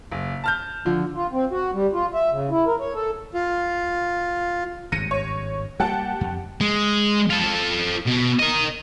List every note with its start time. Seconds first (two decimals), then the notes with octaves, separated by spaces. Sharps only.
0.12 F#1
0.44 A5 F6 G6
0.86 D3 F3
1.13 F4
1.32 C4
1.51 F#4
1.73 G3
1.93 F4
2.14 E5
2.31 C#3
2.51 E4
2.67 A#4
2.80 C#5
2.95 A4
3.34 F4
4.92 G#1 G2 A#6 C#7 D#7
5.11 C#5
5.80 G3 A#3 G4 F#5 A5
6.21 F2
6.61 G#3
7.30 F4 A4
8.07 B2
8.39 A#4 D#5